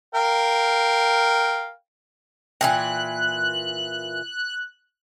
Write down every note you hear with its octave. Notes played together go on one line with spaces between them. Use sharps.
A#4 F5 G5
A#2 E3 G5 G#5 F#6